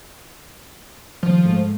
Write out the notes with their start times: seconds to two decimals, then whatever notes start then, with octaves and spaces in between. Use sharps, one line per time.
1.23 D#3 F3 G3
1.46 G#2 G#3 A3